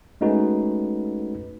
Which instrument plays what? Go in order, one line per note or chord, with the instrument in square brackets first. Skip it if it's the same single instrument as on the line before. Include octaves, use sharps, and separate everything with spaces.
[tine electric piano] G#3 A3 C#4 D#4 F#4 B4